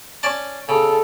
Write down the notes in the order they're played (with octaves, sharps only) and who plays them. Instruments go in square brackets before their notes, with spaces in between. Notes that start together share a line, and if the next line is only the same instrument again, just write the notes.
[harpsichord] C#4 D5 A5
[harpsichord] C#3 [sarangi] A4